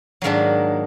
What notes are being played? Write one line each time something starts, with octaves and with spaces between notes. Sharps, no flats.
G#2 D#3 F#3 A#3 D4